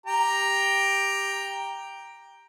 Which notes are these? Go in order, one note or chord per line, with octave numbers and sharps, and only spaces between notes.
G4 G5 A#5